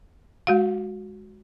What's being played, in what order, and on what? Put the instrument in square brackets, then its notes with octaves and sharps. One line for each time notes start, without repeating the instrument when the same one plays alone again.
[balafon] G#3 F#4 F5